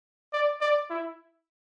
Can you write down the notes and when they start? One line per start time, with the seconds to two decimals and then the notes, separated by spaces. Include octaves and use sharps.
0.33 D5
0.61 D5
0.90 E4